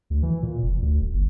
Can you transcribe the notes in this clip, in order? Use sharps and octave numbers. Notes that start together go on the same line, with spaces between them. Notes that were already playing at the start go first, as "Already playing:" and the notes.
D2
E3
A#2
F1
D2
D1
G1